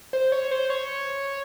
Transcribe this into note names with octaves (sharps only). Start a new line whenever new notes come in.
C5
C#5
C5
C#5